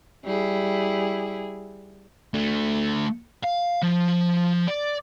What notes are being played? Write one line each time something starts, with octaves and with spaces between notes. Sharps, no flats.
G3 E4 G#4
A3 D4
F5
F3
D5